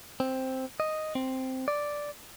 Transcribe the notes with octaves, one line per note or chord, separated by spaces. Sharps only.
C4
D#5
C4
D5